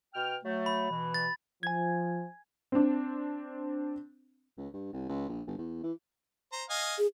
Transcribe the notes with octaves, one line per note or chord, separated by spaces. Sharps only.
B2 G5 F6
F#3 A3
B5
B2 E3
A6
F3 G#5 G#6
C4 D4
C#2
G2
C2
C#2
A#1
G1
E2
E3
C5 A#5
D#5 F5 G#5
G#4